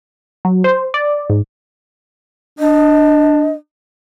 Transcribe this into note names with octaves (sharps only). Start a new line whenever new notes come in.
F#3
C5
D5
G#2
D4 D#5